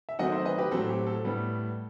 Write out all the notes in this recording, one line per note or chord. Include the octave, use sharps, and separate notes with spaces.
E5
D#3 F#3 A3 C4 D#5 F#5
C5 E5
B4 D#5
G4 B4
A2 F#3 C4 A4
G4
A4
A2 G3 B3